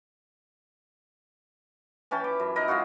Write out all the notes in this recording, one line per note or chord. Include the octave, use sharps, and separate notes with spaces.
E3 C#4 G5 A5
D6
F#2
D#4 E4 A#4 D#5
F#3 G#3 F4 F#4